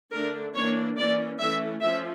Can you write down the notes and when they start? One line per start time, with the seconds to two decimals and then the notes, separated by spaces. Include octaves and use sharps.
0.12 D3 A3 D4 A#4
0.54 E3 A#3 D4 C#5
0.97 E3 A#3 C#4 D5
1.39 E3 A3 C#4 E5
1.82 F3 C#4 E5